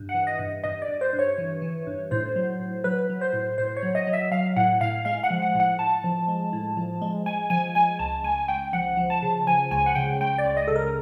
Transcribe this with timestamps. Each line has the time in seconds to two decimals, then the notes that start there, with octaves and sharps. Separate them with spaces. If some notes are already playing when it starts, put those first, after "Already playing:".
Already playing: G2
0.09 F#5
0.14 E3
0.27 D#5
0.39 G2
0.64 G2 D#5
0.82 D5
0.88 G2
1.01 C5
1.13 G2
1.19 C#5
1.38 E3
1.62 E3
1.87 G2
2.11 A2 C5
2.36 F#3
2.60 A2
2.84 F#3 B4
3.09 F#3
3.21 C5
3.33 A2
3.58 A2 C5
3.77 C#5
3.83 F#3
3.95 D#5
4.07 F#3
4.13 E5
4.31 F#3 F5
4.57 A2 F#5
4.81 A2 F5
5.05 G#3 F5
5.23 F#5
5.30 F3
5.42 F#5
5.55 A2
5.60 F#5
5.79 A2 A5
6.04 F3
6.28 G#3
6.53 A2
6.77 F3
7.02 G#3
7.26 G#3 G#5
7.50 F3 G#5
7.75 G#3 G#5
7.99 C#2 A5
8.24 C#2 G#5
8.48 C#2 G5
8.73 F3 F#5
8.97 F3
9.10 A5
9.22 C#3
9.47 F3 G#5
9.71 C#2 G#5
9.86 F#5
9.95 C#3 G5
10.21 C#2 G5
10.38 D5
10.45 C#2
10.57 D#5
10.68 C#3 A4
10.76 A#4